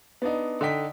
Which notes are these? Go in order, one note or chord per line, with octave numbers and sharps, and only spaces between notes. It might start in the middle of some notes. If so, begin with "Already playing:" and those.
B3 D4 D#4
D3 D#4 G5 B6